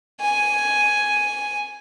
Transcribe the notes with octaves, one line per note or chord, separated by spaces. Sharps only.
G#5